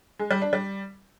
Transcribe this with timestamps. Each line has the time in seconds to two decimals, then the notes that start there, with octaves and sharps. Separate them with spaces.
0.19 G#3
0.31 G3
0.42 D4
0.53 G3